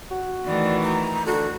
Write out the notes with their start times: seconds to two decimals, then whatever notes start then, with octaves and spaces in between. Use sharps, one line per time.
0.11 F#4
0.45 D#3 E3 A3 D5
0.82 A#5
1.26 D3 F#4